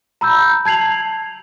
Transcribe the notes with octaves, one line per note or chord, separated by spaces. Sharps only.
A#5 B5 E6 G6
A5 G#6 C7 F7 F#7